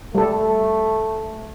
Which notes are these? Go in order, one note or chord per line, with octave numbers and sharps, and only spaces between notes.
G3 A3 A4